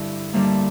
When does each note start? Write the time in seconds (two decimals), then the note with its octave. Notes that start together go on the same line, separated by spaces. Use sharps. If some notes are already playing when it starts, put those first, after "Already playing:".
Already playing: G2 D3 G3 E4
0.33 G2 D3 G3 A#3 E4